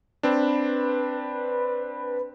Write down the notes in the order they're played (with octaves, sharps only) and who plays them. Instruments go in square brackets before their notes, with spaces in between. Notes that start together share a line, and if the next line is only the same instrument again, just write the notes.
[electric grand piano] C4 D4 [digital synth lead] B4